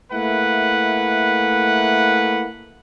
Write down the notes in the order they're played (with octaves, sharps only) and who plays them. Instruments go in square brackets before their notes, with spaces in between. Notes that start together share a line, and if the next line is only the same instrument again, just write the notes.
[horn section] A3 A#3 E4 B4 F#5